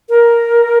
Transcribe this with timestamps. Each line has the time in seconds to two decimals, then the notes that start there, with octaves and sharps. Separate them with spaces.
0.10 A#4